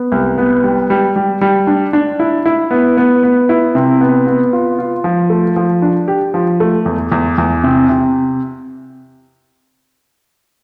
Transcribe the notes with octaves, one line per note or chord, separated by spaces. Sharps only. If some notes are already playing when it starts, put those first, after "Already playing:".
Already playing: B3
C2
B3
G3
G3
G3
G3
D4
D4
E4
E4
B3
B3
B3
E4
C3
B3
B3
F4
F4
F3
A3
F3
D4
G4
F3
A3
E2
E2
E2
C3
C3